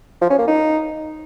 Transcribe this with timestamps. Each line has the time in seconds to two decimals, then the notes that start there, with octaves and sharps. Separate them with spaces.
0.21 F3
0.30 C#4
0.39 A#3
0.47 D#4